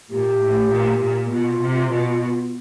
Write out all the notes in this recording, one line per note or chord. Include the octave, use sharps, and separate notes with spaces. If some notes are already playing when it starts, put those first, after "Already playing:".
A#2 G4
A2
A#2
A#2
B2 F4
C3
B2